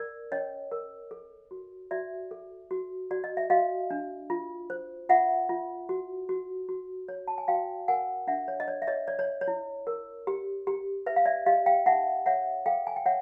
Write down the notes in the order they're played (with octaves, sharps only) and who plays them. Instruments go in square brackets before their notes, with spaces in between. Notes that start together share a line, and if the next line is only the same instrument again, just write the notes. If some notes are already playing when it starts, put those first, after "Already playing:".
Already playing: [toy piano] A#4 D5
C#4 C#5 D#5
A#4
A4
F#4
F#4 D5 E5
A4
F#4
F#4 D5
D#5
E5
F#4 D#5 F5
D4
F4
C5
F4 E5 F#5
F4
F#4
F#4
F#4
C#5
A5
G#5
F#4 F5 G5
A#4 F#5 G#5
D4 E5 F#5
C#5
D#5
C#5 D5
E5
C#5 D#5
C#5 D5
C#5
C#5
E4
A#4
G4
G4
B4 E5
F5
D5 E5
G4 D#5 F5
F5 G5
D#4 E5 F#5
C#5 E5 F#5
A4 F5 G5
G#5
G5
C#5 E5 F#5